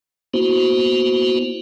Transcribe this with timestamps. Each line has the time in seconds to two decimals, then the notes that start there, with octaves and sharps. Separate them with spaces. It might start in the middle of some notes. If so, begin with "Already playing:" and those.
0.34 A#3 B3 E4 F#4 C5